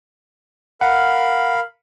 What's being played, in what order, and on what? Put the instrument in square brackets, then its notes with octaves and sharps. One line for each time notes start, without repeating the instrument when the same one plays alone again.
[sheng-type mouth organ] A#4 F5 B5 [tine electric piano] F#5